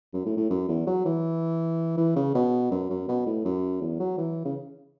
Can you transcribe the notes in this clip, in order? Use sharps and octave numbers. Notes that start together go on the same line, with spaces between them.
F#2
A2
A2
F#2
E2
F#3
E3
E3
C#3
B2
F#2
F#2
B2
A2
F#2
E2
F#3
E3
C#3